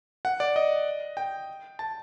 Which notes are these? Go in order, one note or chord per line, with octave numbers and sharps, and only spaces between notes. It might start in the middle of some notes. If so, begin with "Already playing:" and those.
F#5
D5
D#5
G5
A5